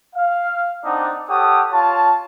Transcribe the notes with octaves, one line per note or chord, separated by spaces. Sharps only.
F5
C4 D4 D#4 D5 F#5
G4 A4 C#5 F#5 D#6
F4 C#5 A5